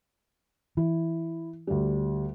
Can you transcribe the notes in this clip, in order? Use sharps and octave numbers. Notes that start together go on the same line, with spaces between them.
E3 E4
D2 G3